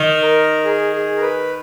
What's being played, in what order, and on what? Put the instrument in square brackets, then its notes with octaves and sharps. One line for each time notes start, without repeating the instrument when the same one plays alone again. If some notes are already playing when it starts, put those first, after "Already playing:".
Already playing: [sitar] D#3
[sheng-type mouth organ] A#4
G#4
G#4
A#4
B4